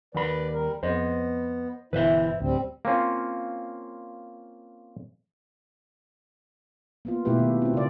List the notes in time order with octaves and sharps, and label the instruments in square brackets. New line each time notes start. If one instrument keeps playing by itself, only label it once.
[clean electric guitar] D#2 B5 [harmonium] B4 D5
[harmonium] G3 A#4
[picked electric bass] F2 [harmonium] B3 [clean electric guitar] C5 D#5
[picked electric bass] G1 B2 E3 [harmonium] E4 [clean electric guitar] B4 C5 E5
[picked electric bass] D1 D2 [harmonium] G3 C4
[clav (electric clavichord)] A#3 C4 C#4 F4
[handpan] A#3 B3 F4
B2 A3 E4 G4 B4
D#3
C4 F4
C#3 D5